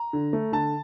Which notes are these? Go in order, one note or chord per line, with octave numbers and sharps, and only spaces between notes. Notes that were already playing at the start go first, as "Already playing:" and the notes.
Already playing: A#5
D3
A3
D3 A5